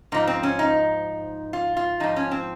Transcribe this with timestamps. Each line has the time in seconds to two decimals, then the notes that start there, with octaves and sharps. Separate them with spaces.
0.12 G#2 F3 D#4
0.27 C4
0.43 C#4
0.59 D#4
1.53 F4
1.77 F4
2.00 G#2 F3 D#4
2.16 C#4
2.31 C4